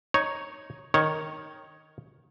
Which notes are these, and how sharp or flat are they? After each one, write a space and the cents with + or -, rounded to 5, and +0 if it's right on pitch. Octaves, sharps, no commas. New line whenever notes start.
D#4 +0 C#5 +0
D#3 +0 C#5 +0